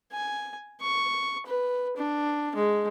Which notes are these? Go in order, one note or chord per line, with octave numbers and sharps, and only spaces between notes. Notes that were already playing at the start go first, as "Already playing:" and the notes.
G#5
C#6
B4
D4
G#3